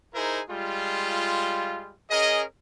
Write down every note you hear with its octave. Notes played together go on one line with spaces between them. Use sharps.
D#4 E4 G#4 A#4 C5
G3 G#3 F4
C#4 G#4 A#4 D#5